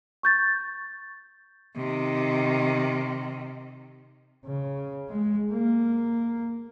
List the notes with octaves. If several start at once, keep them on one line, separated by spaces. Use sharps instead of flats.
C#6 G6 A6
C3 D#3
C#3
G#3
A#3